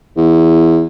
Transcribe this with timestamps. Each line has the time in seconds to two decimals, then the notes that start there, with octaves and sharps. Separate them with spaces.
0.17 E2